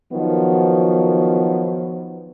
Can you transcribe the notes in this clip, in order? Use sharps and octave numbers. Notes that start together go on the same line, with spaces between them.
D#3 F3 F#3 B3